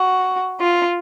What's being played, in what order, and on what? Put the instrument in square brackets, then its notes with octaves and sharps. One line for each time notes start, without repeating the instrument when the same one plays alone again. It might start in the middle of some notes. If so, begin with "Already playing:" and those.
Already playing: [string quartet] F#4
F4